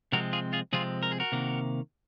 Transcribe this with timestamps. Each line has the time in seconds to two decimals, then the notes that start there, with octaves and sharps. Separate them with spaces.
0.12 C3 F3 G#3 C4 F#4 A#4
0.33 F4 G#4
0.53 F4 G#4
0.73 C3 F3 G#3 C4 F4 G#4
1.03 A#4
1.12 G#4
1.20 F#4 A#4
1.32 C3 D#3 A#3